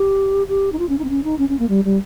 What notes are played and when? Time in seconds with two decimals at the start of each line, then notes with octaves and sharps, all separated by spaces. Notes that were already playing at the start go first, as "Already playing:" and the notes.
Already playing: G4
0.48 G4
0.72 D#4
0.79 F4
0.89 C#4
0.99 D#4
1.04 C4
1.09 C#4
1.24 D#4
1.38 C#4
1.49 C#4
1.59 A#3
1.69 G3
1.84 G3